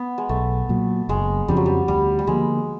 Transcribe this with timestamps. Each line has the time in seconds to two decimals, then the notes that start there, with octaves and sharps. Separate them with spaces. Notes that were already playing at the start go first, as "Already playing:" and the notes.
Already playing: B3
0.18 G#3
0.29 B1 A3
0.69 A#2 F#3
1.09 F#1 G#3
1.48 F2 C#3 F3 G3
1.57 F#3
1.66 G3
1.88 D2 G3
2.19 G3
2.27 D3 F3 G#3 A#3